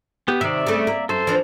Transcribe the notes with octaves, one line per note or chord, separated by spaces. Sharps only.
B3 G4
C3 D#3 D5 E5
C#3 A3
A#3
F#2 A4 C5
E3 F3 D4